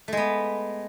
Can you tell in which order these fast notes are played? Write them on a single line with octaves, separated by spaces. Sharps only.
A3 G#3 B3